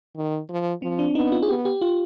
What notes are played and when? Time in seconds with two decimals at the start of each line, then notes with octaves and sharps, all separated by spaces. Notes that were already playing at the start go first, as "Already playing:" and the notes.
0.16 D#3
0.49 F3
0.82 F3 C4
0.99 D4
1.15 B3 D#4
1.32 F4
1.42 G#4
1.49 B3 G4
1.65 G4
1.81 F4